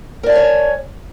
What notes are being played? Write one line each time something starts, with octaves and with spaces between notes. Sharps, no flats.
A#4 C#5 D5 G#5 A5